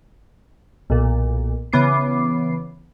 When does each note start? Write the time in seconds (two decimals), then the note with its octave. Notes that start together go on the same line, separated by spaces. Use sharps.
0.90 B1 A#2
1.73 C#3 E3 B3 D6 C7